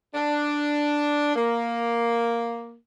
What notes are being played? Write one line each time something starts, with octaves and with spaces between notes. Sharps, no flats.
D4
A#3